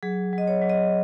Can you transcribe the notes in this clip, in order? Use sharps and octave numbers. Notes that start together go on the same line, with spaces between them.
F#3 G#4
F#3
D#5
C#5
F#3
D#5